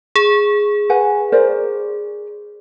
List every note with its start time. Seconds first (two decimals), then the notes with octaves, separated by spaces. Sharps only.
0.16 G#4
0.89 B4 F#5 G#5
1.32 A#4 C5 D5